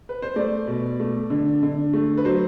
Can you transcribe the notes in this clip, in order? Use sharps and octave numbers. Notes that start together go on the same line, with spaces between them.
B4
C5
A3 D5
B2
A3
D3
D3
A3
B4
F#3 C5